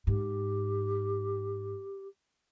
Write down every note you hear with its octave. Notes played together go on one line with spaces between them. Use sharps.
G#2 G4